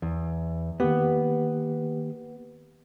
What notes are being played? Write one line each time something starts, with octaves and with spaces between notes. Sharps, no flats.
E2
D#3 A#3 B3 G4